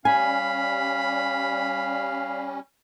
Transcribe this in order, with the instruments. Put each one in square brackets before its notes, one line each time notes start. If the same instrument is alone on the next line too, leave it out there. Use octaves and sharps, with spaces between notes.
[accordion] G3 C#4 [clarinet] F5 [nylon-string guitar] G#5 [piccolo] B5